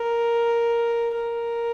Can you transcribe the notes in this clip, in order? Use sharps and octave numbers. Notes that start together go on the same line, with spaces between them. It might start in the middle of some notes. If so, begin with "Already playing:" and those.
Already playing: A#4
A#4